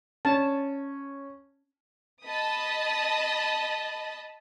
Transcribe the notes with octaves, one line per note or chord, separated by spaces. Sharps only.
C#4 A5
D#5 A5 B5 D#6